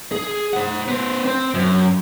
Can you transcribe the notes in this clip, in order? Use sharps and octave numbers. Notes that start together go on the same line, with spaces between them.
G#4
C5 F#5
B3 C5
C4 C5
F#2